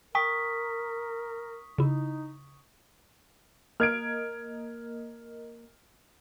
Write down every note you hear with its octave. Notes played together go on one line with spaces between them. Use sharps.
A#4 G5 C#6 D#6 B6
C#3 D#4 E4
A#3 A#4 D#5 F6 G#6 D7